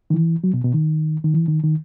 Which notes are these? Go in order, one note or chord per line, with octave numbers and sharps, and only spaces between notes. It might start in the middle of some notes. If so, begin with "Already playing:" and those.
D#3
E3
F#3
B2
B2
D#3
D#3
E3
D#3
D#3